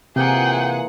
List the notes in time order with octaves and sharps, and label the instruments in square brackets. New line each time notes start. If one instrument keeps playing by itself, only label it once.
[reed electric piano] C3 [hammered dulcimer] E3 A#3 F4 [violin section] G#4 F#5 [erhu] G5